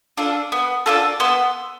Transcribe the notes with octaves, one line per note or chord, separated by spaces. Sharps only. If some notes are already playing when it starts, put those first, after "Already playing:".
D4 F4 A4
B3
D4 F4 A4
B3 C6 E6